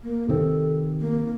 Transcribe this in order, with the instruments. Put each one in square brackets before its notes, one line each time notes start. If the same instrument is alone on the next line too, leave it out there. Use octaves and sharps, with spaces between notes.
[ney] A#3
[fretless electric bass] C3 D#3 C4 [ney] A4
[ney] A#3